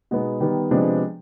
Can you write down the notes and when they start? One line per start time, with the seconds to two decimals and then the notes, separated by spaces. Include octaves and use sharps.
0.11 B2 G#3 B3 D#4
0.40 D#3 G3 B3 D#4
0.71 C3 F3 G#3 B3 D4